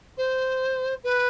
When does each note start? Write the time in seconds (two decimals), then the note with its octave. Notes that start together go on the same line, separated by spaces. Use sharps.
0.17 C5
1.04 B4